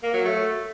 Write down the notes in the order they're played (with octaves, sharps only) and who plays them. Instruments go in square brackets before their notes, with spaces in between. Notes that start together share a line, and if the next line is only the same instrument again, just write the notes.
[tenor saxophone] A#3
F#3
A3